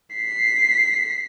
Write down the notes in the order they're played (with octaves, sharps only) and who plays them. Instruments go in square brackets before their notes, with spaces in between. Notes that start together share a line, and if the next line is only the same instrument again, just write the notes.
[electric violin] B6 C7